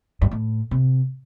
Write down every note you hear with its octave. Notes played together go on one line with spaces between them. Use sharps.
G2
A2
C3